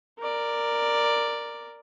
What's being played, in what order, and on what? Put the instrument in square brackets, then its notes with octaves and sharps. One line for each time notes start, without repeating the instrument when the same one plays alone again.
[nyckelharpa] A#4 D5